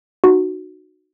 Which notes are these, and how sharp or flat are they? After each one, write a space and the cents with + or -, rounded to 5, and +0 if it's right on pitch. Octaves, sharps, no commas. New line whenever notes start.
D#4 -35 F#4 -5